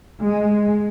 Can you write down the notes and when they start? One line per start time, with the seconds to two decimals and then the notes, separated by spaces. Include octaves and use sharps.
0.21 G#3